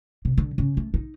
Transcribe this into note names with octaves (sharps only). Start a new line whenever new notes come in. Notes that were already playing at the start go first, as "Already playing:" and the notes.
C3
D3
C#3
A3
D#4